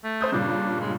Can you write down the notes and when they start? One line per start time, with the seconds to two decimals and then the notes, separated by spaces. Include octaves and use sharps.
0.04 A3
0.21 C5 D#6 G6
0.32 G2 A#2 C#3 D4
0.81 G#3